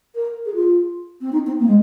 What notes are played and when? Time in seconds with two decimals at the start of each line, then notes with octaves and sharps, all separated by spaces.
0.15 A#4
0.45 G#4
0.54 F4
1.21 C4
1.32 D#4
1.46 C4
1.59 A#3
1.67 G#3